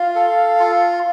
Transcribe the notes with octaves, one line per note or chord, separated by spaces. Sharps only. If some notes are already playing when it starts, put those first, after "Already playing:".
Already playing: F4 F5
A4
F4